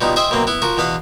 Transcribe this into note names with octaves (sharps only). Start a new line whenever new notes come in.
B2 F3 G3 D#4
G#4 C5 D#5 E5 G5
F#2 B2 A#3 C4
B3 E4
F3 F#4 A#4
E2 B2 B3 F5 B5